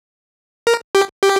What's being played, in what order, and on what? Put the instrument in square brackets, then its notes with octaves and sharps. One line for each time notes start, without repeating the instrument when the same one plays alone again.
[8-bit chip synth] A#4
G4
G4